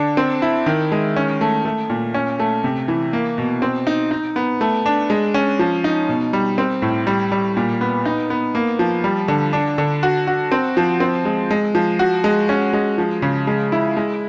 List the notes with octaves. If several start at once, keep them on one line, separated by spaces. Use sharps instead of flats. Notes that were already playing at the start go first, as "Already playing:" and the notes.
Already playing: D3 D4
C4
E4
D#3
G#3
C#4
A3
A3
A#2
C#4
A3
C3
E3
A#3
B2
C4
D#4
D#4
B3
A3
D4
G#3
C#4
F3
D#4
B2
G3
C4
A2
G3
G3
A#2
B3
D#4
B3
A#3
F3
G3
D3
D4
D3
F#4
F#4
C4
F3
C4
G#3
G#3
F3
F#4
G#3
C#4
G#3
F3
C#3
G#3
E4
G#3